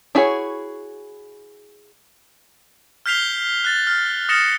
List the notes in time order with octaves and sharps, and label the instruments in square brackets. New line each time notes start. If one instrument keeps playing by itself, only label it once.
[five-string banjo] D4 E4 F#4 G#4 C#5
[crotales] F6 G6 B6 C7 F7 G7
F#6 A6
F6
D#6 F6 A6 A#6 C#7 E7